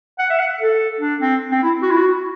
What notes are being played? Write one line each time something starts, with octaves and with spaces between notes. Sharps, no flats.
F#5
E5
F#5
A4
D4
C4
C4
E4
F#4
E4
F#4